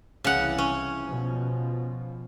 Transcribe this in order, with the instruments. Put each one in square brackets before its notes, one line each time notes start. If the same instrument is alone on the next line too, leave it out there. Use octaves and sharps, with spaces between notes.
[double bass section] C2 E3 [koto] C#3 F#5
[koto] C#4
[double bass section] B2 F3